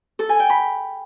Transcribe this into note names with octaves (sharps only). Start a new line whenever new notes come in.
A4
G#5
G5
B5